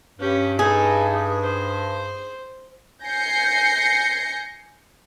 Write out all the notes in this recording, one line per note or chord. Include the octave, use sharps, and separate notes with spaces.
G2 C#4 G4
D#4 G#4 A4
C5
G#5 G6 A#6 C7 C#7